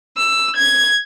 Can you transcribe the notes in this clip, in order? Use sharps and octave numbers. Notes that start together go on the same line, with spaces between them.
E6
G#6